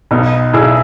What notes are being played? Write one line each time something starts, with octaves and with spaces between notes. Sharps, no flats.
B1 B3 D#4
B1 E4 G#4